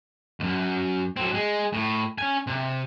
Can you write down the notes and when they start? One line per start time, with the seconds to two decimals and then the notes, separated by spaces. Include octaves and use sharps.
0.40 C#2 F#2
1.17 F#3 C4
1.34 G#3
1.73 A2
2.18 C#4 G#5
2.47 C3